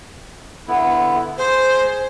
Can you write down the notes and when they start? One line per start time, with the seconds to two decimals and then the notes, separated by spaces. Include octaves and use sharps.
0.68 D3 B3 E4
1.38 G#4 C5